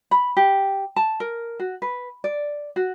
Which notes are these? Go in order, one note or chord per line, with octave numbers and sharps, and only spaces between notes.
B5
G4
A5
A#4
F#4
B4
D5
F#4